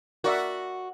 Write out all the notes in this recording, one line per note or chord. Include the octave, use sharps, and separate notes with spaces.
F#4 A#4 D5 E5